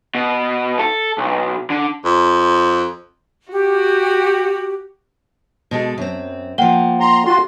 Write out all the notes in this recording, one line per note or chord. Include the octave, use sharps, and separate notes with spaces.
B2
A4
B1
D3
F2
F#4 G4
B2 G#3 A4
F#2 C4
F3 A#3 F#5 G5 G7
A#5 C6
F4 F#4 C6